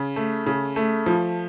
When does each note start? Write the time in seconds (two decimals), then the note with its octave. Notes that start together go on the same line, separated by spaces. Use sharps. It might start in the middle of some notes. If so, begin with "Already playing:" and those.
Already playing: C#3
0.16 A3
0.46 C#3
0.76 A3
1.06 F3